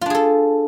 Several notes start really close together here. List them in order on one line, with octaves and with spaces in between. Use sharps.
F4 D4 G#4 A4